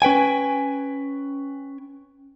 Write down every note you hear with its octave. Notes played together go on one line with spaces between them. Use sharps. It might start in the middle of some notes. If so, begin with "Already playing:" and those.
C#4 B4 G5 G#5